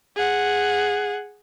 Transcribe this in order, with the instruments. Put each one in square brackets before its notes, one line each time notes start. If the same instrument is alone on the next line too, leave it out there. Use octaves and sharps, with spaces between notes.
[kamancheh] G#4 F#5